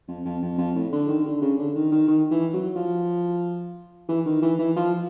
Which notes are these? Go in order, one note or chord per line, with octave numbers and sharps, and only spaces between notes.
F2
F2
F2
F2
A2
D3
D#3
D3
C#3
D3
D#3
D#3
D#3
E3
F#3
F3
E3
D#3
E3
E3
F3